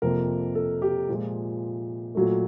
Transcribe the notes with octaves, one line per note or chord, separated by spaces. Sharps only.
F2 C3 F3 A#3 A#4
A4
G4
A#2 F3 G#3
A#2 F#3 A3